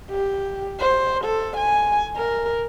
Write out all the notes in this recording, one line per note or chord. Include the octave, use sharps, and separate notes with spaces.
G4
C5
A4
G#5
A#4